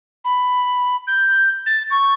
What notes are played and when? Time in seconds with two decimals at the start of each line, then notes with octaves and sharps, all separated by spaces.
0.24 B5
1.07 G6
1.66 A6
1.91 C#6